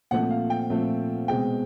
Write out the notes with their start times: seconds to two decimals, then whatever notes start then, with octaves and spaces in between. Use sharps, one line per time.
0.11 A#2 F3 A3 C4 F#5
0.30 F5
0.50 G5
0.70 A#2 F3 A3 C4
1.28 B2 G#3 C4 G5